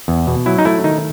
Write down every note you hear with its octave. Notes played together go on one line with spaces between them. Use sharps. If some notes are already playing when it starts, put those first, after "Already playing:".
E2
B2
F#3 E4
D#4
A3 E4
D#3 D#4